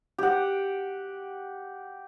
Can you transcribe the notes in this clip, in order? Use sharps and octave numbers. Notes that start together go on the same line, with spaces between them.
G4 F#5